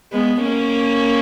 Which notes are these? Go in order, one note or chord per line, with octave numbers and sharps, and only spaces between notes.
G#3 B3
A#3 C#4